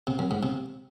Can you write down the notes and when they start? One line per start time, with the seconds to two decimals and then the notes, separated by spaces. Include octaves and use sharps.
0.07 C3
0.19 F#2
0.31 G#2
0.43 C3